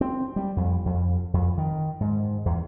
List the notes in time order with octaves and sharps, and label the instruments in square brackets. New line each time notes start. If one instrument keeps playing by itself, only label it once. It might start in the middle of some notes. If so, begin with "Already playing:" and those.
[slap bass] C4
G3
F2
F2
F2
D#3
G#2
E2